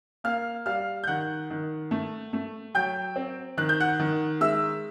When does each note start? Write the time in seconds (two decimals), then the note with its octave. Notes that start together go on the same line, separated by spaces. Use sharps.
0.24 A#3 F5 F6
0.66 G3 F5 F6
1.04 G6
1.07 D#3 F#5 F#6
1.50 D#3
1.91 A3
2.33 A3
2.74 F#3 G5 G6
3.16 C4
3.57 D#3 F#6
3.69 G6
3.80 F#5 F#6
3.99 D#3
4.41 G#3 E5 E6